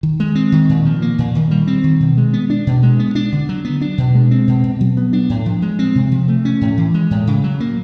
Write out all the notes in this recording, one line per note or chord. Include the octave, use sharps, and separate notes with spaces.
D#3
G#3
C4
D#3
A#2
F3
A#3
A#2
D#3
G3
C4
D#3
B2
G#3
B3
D4
B2
G#3
B3
D4
D3
F#3
B3
D4
B2
G#3
C4
B2
B2
F#3
B3
D4
A2
F3
G#3
C4
C3
F3
A3
C#4
A2
E3
G#3
A2
C#3
F#3
A#3